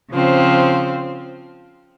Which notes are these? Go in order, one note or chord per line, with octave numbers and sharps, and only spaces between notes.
C#3 F3 C4